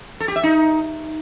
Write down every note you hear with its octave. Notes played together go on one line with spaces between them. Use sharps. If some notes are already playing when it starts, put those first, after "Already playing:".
A4
G4
E5
D#4